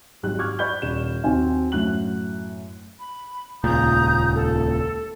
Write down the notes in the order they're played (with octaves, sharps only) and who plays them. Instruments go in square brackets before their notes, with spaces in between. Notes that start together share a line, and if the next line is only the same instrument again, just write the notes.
[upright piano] G#1 F#3 G3 F#6
C#6 D6 F6 G#6
D5 B5 C#6 G6 G7
D#1 E7
D#2 C4 F#4 G#5
F#2 A2 F#4 F#6 F#7
[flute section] B5
[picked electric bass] D#1 C#2 A#2 [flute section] A#5 D#6 G6
[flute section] A4